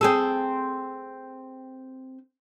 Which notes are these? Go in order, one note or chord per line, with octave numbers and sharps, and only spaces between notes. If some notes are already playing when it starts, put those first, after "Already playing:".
C4 G#4 A4